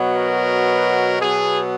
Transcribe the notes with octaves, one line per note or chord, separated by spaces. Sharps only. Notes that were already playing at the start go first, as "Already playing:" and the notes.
Already playing: B2 F#3 B3
A#4
B2 F#3 B3 G#4